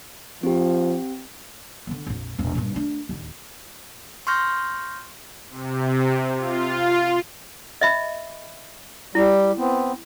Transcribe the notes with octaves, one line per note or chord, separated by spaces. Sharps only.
F3 C4 G4
D3 B3
A#1 F2
E1 A#1
G2 A#2
A3 D4
D1 D#2
C6 C#6 F6 G6 A#6
C3
F4
D#5 E5 B5
G3 E4
B3 C4